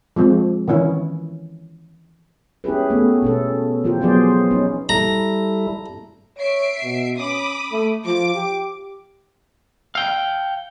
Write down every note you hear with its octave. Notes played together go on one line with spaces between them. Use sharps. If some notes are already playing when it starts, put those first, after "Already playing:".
F3 G#3 C4
D#3 E3 C#4 E4
C#4 E4 G4 G#4 B4
A3 B3
B2 C#4 A4
E3 F3 F4 G4 A#4 C5
F3 F#3 B3 G#4 C5 D5
C#4 D#4
G3 E4 A4 A#5
C#5 E5 C7 D7
B2
C#4 B5 D6 D#6
A3
F3 D6
G4
F5 G5